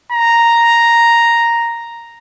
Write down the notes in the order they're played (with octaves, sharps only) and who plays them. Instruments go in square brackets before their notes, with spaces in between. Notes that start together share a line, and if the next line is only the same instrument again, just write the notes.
[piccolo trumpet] A#5